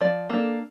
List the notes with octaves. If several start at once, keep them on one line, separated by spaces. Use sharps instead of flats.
F3 D5
A#3 D4 A4